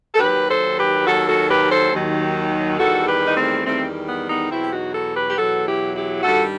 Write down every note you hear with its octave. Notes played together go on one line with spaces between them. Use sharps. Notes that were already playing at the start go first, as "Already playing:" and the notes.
A4
D#2 D#3 F#3 G4 B4
A4 C5
G4 B4
D#2 D#3 F#3 F#4 A4
F#4 A4
G4 B4
A4 C5
D#2 D#3 F#3
E2 D#3 G3 F#4 A4
G4 B4
D#4
A3 C4
E2 D#3 G3 A3 C4
B3
B3 D#4
E2 B2 F#3 C4 E4
G4
D#4 F#4
F#4 A4
G4 B4
G4
E2 B2 F#3 F#4 A4
E4 G4
E4 G4
G2 D#3 G3 F#4 A4